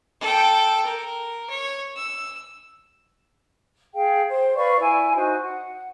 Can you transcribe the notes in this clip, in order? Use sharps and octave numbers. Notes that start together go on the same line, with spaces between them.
A4 G5
A#4
C#5
E6
G#4 F5 G5
C5
B4 D5 F5 C#6
E4 G#5
D#4 F#4 C5
F#5